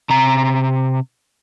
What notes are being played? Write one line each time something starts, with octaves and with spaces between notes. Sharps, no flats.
C3 A#5